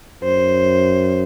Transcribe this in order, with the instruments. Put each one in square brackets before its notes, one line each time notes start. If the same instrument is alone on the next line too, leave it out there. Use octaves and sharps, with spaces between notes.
[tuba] F#2 [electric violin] C5